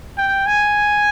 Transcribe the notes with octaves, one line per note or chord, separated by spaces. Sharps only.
G5
G#5